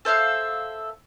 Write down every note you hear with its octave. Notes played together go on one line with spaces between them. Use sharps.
A4 C5 E5 F5